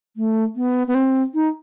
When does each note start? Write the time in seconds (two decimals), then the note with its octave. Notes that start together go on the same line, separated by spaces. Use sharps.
0.17 A3
0.56 B3
0.87 B3
0.95 C4
1.34 D#4